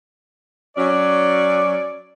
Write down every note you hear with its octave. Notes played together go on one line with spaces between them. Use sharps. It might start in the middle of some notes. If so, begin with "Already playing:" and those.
F#3 C#4 D5